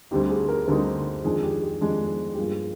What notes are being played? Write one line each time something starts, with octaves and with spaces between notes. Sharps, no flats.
D2 D3 G3 C4 D#4 G4
G#4
A#4
D2 D3 G3 C4 D#4 A#4
F2 D#3 G#3 D4 G#4
G4
G4
F2 D#3 G#3 D4
G4
G2 F3 A#3 G#4